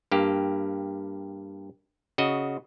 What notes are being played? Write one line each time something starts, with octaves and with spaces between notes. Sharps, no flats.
G2 A#3 G4
C#3 F#4 D#5